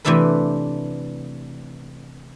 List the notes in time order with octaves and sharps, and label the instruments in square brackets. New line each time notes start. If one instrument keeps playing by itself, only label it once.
[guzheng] C3 E3 A3 D4 A4 B4